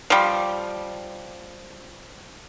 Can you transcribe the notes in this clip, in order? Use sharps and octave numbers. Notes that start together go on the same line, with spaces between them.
F3 G3